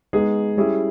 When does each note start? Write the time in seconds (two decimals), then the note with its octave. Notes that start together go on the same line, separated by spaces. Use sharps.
0.13 G#3 B3 D#4 G#4
0.57 G3 C#4 E4 G#4